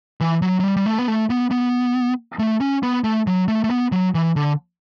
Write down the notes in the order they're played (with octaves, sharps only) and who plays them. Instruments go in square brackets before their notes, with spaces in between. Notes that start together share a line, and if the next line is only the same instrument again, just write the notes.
[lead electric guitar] E3
F#3
F#3
G3
G3
A3
B3
A3
B3
B3
A3
C#4
B3
A3
F#3
A3
A3
B3
F#3
E3
D3